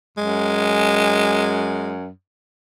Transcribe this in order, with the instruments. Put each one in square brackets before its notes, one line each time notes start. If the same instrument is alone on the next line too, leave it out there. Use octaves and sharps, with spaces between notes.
[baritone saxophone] F#2 [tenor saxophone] G#3